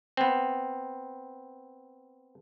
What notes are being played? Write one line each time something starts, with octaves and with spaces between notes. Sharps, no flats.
B3 C4